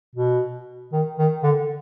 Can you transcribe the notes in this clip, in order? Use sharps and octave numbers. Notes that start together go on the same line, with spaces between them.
B2
D#3
D#3
D3